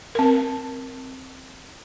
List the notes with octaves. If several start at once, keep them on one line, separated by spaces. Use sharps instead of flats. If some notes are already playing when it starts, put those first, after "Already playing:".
C4 A#4